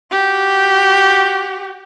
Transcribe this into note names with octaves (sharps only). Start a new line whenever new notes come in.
F#4 G4